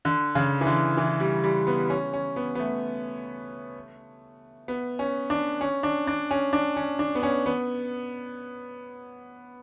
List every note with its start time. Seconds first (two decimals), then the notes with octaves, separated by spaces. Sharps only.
0.05 D3
0.35 C#3
0.61 E3
0.67 D3
0.97 E3
1.20 G3
1.44 G3
1.67 B3
1.90 C#4
2.13 C#4
2.36 B3
2.55 B3
2.59 A3
4.68 B3
4.99 C#4
5.30 D4
5.61 C#4
5.83 D4
6.07 D4
6.31 C#4
6.53 D4
6.76 C#4
6.99 D4
7.15 B3
7.23 C#4
7.46 B3